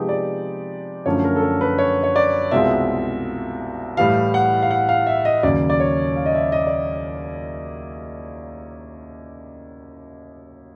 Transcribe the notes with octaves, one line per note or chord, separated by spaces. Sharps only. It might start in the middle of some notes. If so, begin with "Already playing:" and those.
Already playing: C3 F3 G#3 B3 D#4 G4 G#4
D5
F#2 D3 F3 A3 C#4 C#5
A#4
A4
A#4
B4
C#5
C#5
D5
C2 B2 G#3 C4 F4 E5
A2 E3 G3 F5
F#5
F5
F#5
F5
E5
D#5
D#2 C#3 F#3 D5
D5
C#5
F5
D#5
E5
D#5
D5